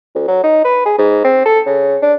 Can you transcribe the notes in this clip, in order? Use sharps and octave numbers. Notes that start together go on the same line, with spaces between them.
D2
F#3
D#4
B4
G#4
G#2
C4
A4
C#3
D4